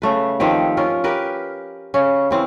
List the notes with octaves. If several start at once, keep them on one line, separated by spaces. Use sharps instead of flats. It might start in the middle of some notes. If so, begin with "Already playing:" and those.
C#3 A3 B4
D#3 F3 C4 G4
C#4 F4 A#4
G4 A#4 B4
C#3 C#4
E3 C4 C#4